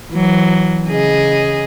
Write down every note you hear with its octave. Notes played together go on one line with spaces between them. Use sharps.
E3 F#3
C#3 G#4 D#5